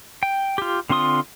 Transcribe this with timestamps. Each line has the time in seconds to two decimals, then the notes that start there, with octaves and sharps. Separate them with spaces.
0.23 G5
0.58 F4 G4
0.90 D3 C4 F4 C6 D#6